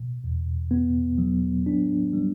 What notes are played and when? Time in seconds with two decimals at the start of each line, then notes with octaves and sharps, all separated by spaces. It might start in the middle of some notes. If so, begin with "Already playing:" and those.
Already playing: B2
0.24 E2
0.71 B3
1.18 F#3
1.66 D4
2.13 G3